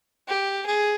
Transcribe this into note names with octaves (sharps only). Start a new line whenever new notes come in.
G4
G#4